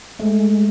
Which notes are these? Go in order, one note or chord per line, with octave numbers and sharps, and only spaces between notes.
G#3 A3